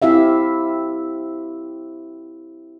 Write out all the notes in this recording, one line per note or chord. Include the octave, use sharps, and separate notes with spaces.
C4 E4 G4 E5 F5